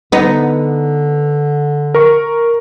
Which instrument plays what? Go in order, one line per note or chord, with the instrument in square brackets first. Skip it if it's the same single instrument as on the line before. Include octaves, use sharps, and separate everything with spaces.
[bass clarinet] D3 [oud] B3 D#4
[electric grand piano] A#4 C#6